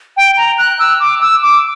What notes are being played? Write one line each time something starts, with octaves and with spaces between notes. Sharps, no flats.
G5
A#5
F#6
E6
D6
E6
D6